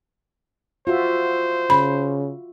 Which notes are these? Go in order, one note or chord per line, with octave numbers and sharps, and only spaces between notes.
F4 F#4 C5 E5
C#3 B5